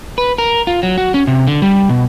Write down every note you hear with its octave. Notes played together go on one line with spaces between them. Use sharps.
B4
A#4
F4
F#3
F#4
C#4
C3
D3
G3
B2